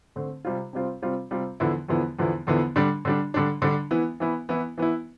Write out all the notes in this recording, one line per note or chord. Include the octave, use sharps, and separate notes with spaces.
D3 A3 C4
C3 G3 C4 F4
C3 G3 C4 F4
C3 G3 C4 F4
C3 G3 C4 F4
E2 D3 F3 B3 E4
E2 D3 F3 B3 E4
E2 D3 F3 B3 E4
E2 D3 F3 B3 E4
D3 G3 D4
D3 G3 D4
D3 G3 D4
D3 G3 D4
E3 B3 E4
E3 B3 E4
E3 B3 E4
E3 B3 E4